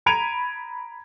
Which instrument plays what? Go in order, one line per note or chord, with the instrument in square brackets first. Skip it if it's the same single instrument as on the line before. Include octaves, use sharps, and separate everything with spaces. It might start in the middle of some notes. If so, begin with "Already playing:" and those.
[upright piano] A#5 B5 G#6 D7 D#7 F7